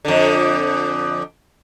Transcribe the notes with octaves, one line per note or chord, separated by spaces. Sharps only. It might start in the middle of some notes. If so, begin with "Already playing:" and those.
F2 D3